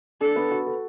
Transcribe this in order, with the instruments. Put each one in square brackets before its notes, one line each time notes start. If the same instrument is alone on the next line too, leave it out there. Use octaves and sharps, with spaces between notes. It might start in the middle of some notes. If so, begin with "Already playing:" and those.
[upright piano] D4 [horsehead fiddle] A4
[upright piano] B3
F#4
A4